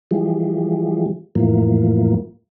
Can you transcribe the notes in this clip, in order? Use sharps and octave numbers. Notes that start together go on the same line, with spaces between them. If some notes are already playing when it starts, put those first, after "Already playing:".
E3 F3 G3 G#3
F2 A2 E3 F3 A#3